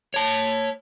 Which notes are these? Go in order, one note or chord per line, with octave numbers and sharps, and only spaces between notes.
C#5 A5